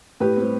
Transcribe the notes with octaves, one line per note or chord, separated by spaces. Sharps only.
A2 G4 B4
G3 C4